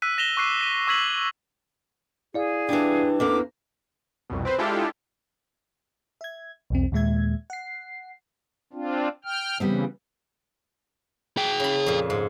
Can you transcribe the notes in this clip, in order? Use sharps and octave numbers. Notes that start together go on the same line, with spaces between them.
E6 F#6 B6 D#7
A#6 E7 F7 G7
C#6 D6 F#6 C7 D#7
B6 D#7
C#6 E6 G#6 B6 F#7
E4 G#4 D5 F5
E3 G3 D4
E2 E3 A#3 C#4 A4 D6
C2 F2 B2
C4 B4 C5
G#3 D4 E4 F4 G4 A4
E5 G#6
B1 E2 C4
D#2 A#2 G#3 E5 G#6
F#5 C7
C4 D4 F4
G5 F6
C#3 E3 G3 B3 C4
G#4 G5
C#3 B5
F2 A#2
G#2